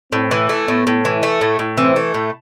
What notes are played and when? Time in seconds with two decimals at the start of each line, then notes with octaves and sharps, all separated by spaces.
0.12 A2 C4
0.31 E3
0.49 A3
0.68 A2 B3
0.87 A2
1.05 E3
1.23 A3
1.41 A2
1.59 A2
1.77 E3 C4
1.96 A3
2.14 A2